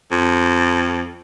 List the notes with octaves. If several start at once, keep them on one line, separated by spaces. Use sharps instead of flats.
F2